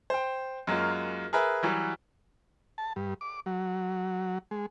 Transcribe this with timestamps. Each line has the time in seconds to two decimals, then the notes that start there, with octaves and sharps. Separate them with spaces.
0.10 C5 G5
0.67 F#2 F#3 G#3 A#3 F4
1.33 G#4 A#4 B4 E5
1.63 E3 F#3 G3
2.78 A5
2.96 G2
3.21 D6
3.46 F#3
4.51 G#3